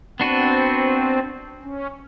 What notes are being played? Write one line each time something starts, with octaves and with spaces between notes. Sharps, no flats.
B3 C4 D4 F#4 B4
C#4